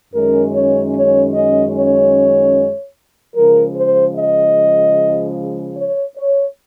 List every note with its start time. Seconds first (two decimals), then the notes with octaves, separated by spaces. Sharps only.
0.14 F#2 D#3 G#3 C#4 A#4
0.54 C#5
0.94 C#5
1.34 D#5
1.75 C#5
3.35 C#3 F3 G#3 A#4
3.75 C5
4.16 D#5
5.76 C#5
6.17 C#5